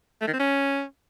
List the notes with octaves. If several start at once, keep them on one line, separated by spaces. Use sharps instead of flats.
A3
D#3
C4
C#4